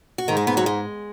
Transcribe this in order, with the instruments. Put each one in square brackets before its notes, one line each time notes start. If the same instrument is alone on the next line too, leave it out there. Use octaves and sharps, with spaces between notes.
[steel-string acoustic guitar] F#4
[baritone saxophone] G#2 [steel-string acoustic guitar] D#3 D#4
[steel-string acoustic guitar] G#3 G#4
B3 B4
F#3 F#4
G#3